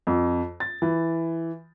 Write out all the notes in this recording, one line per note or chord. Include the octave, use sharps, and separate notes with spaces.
F2
A6
E3